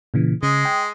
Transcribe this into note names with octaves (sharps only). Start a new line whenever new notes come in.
A#2 C#3 E3
C#3 G#3
G5